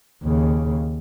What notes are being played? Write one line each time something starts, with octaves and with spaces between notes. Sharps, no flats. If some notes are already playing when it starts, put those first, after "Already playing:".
D#2 C#3